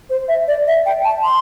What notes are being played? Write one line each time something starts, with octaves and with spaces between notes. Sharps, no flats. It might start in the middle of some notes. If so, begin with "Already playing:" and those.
C5
E5
D5
E5
G5
A5
C6